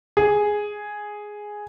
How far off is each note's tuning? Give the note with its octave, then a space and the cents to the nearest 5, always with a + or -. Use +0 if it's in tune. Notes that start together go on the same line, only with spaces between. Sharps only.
G#4 +0